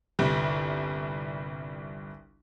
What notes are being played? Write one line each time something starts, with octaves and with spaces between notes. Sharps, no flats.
G1 C2 G3